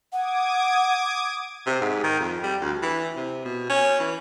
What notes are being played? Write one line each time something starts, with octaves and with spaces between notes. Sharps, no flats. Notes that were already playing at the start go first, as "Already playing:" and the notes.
F#5 D6 D#6 G#6
C3
G#2
D#3
F2
G3
D2
E3
C3
B2
C#4
E3